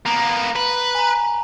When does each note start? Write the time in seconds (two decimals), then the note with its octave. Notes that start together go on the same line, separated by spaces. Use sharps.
0.06 A#3 B3 A#5
0.56 B4
0.95 G#5 A#5